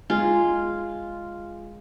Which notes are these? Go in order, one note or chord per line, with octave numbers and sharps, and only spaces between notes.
G#3 F4